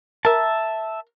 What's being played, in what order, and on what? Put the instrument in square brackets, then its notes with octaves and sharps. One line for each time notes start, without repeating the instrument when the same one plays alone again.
[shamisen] A#4 [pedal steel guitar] E5 A5